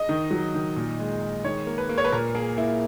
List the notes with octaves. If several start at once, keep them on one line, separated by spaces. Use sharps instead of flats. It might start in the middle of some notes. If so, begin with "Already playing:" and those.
Already playing: D#5
D#3
F#3
D#3
A#2
G#3
G#3
D#3 C#5
A#3
B4
A#3
C#5
B4
A#2 A#4
A#3 G#4
A#3 E4